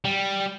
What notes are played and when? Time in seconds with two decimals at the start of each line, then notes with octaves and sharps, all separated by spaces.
0.05 G3